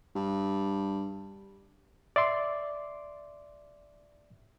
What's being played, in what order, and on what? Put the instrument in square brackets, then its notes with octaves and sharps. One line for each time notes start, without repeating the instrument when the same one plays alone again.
[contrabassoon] G2
[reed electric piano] D5 E5 C6 D6